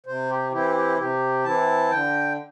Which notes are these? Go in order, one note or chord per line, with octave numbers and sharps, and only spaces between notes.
C3 C5
G4
E3 C4 E4 G4
G4
C3 G4
E3 C4 E4 A5
D3 G5